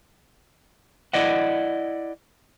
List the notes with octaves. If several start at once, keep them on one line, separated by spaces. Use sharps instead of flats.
E4 D5 D#5 F#5